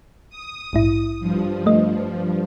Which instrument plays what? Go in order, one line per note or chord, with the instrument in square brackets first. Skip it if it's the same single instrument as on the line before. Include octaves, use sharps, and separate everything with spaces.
[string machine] D#6
[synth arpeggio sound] A#1 G#2 E4
[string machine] G2 F3
[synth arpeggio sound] A3 D#5